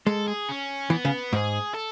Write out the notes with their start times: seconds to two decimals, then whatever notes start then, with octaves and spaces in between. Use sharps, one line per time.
0.06 G#3 A4
0.28 G#4
0.49 C#4
0.90 E3 B3
1.05 C#3
1.33 G#2 G#4
1.74 A4